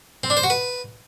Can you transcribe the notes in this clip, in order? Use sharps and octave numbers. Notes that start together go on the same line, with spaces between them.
C4
D4
C5
F#4
B4